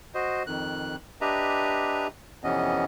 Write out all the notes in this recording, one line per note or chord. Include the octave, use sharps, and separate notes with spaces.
F#4 C5 D#5
F2 D#3 F#6
D4 G4 B4 D#5 E5 A#5
F2 C3 E3 B3 C#4 D#5